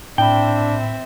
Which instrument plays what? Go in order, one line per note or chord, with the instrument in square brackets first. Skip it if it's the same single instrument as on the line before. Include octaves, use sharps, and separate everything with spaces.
[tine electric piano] A2 B5 [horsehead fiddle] C4 E5 [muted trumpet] D4 [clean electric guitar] G5